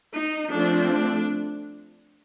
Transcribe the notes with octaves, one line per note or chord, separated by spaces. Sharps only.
D#4
F3 A3 C4 D4
D4